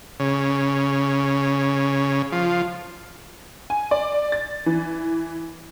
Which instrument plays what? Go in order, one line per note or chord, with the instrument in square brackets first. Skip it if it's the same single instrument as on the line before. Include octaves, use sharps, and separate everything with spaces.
[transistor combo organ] C#3
F3
[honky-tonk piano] G#5
D5
A6
E3